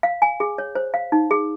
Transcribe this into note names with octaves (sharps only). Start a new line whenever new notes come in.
F5
G#5
G#4
C#5
C5
F5
D#4
G#4